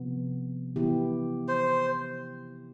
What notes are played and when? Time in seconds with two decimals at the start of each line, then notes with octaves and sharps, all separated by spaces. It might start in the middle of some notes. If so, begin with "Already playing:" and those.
Already playing: C3 F3 B3
0.76 E3 B3 E4 G4
1.48 C5